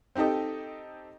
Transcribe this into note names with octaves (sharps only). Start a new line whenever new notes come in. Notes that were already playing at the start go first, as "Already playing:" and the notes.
C4 D#4 G4 A4 D#5